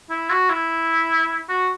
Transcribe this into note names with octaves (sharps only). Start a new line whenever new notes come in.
E4
F#4
E4
F#4